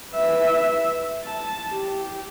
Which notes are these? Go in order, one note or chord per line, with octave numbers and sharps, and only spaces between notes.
B4 E5
A5
G4